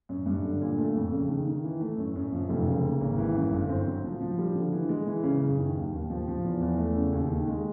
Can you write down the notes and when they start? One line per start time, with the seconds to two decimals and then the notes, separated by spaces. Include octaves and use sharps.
0.09 F#2
0.26 G2
0.43 D3
0.61 A#2
0.78 A3
0.95 F2
1.12 C#3
1.30 D#3
1.47 D#3
1.64 E3
1.81 A3
1.98 F#2
2.16 F#2
2.32 F3
2.49 F1
2.66 C#3
2.84 A#3
3.01 G#1
3.18 E3
3.35 F#2
3.52 G1
3.69 C4
3.87 F#3
4.04 F3
4.20 F3
4.38 G3
4.55 D3
4.72 E3
4.89 G#3
5.07 E3
5.23 C#3
5.42 F#2
5.58 D#3
5.76 D#2
5.93 D#2
6.10 F3
6.28 F3
6.44 E2
6.61 E2
6.78 A3
6.95 C#3
7.13 D#2
7.30 D#3
7.47 G#3